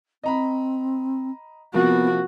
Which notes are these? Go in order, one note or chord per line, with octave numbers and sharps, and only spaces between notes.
C4 D#5 A#5 B5
C3 F3 A#3 B3 F#4